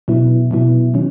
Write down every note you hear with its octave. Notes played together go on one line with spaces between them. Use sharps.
B2 F#3 B3 E4
B2 F#3 B3 E4
D#3 F#3 C#4